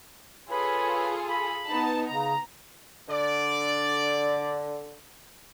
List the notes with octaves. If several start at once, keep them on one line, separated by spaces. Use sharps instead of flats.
F4 G#4 A4 B4 C#5 B5
B5
B3 D#4 A5
C#3 A#5
D3 D5